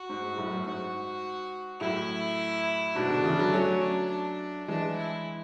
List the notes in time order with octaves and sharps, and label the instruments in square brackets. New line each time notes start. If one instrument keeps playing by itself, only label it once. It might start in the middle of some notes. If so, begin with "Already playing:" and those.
Already playing: [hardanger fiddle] F#4
[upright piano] G#2
G#2
F#2 A2
F#2
[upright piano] G#2 [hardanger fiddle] F#4
[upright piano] F#2 A2 [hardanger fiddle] E4
[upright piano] G#2 B2 [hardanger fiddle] D4
[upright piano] B2 D3
C#3 E3
D3 F#3
[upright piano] F#3 A3 [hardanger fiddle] C#4
[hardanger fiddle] D4
D4
[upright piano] E3 G#3 [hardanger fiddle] D4
[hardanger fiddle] E4